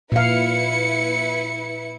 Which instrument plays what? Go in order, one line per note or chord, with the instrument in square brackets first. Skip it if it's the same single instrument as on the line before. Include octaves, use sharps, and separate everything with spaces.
[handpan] A#2 F5 [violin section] E4 B4 C#7